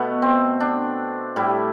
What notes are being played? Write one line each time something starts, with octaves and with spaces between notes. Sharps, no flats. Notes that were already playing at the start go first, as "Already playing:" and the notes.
Already playing: B2 A3 B3
C4
D4
A2 G3 E4